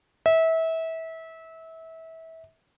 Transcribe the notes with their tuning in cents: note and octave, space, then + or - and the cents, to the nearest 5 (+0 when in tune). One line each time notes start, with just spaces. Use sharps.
E5 -25